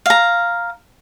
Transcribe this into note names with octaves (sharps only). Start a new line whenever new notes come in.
F5 A#5